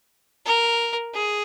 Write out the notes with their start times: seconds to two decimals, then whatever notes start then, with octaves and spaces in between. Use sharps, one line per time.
0.46 A#4
1.14 G#4